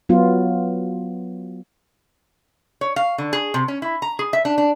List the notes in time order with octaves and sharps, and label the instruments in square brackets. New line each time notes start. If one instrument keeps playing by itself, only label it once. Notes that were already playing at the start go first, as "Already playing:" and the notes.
[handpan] F#3 B3 F4
[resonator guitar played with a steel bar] C#5
F5
D3
G#4
C3
C#4
E4
A#5
G#4
E5
D4
D4